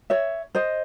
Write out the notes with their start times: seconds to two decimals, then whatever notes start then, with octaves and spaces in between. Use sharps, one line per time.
0.10 C#5 E5
0.55 C5 D#5